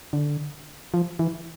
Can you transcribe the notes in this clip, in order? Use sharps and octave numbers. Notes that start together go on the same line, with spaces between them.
D3
F3
E3